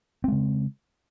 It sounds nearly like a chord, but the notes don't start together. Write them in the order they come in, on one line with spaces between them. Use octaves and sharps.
C4 G#3 C#3